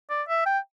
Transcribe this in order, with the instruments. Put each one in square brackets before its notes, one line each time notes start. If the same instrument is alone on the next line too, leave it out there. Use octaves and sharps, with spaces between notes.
[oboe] D5
E5
G5